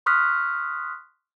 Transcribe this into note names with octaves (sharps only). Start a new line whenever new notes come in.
C6 C#6 D#6 F6 F#6 B6